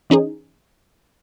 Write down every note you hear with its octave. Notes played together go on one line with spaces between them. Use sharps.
E3 C#4 D#4 G#4